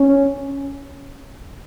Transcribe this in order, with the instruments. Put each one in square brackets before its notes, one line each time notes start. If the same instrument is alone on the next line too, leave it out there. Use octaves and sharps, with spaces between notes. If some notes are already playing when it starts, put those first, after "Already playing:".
Already playing: [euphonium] C#4